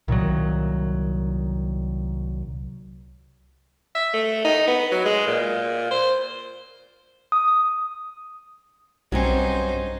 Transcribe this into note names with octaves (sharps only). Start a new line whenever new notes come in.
C2 A#2 D#3 F#3
E5
A3
D#4
B3
F#3
G#3
A#2
C5
D#6
B1 G2 F#3 C4 C#4 D#4 C5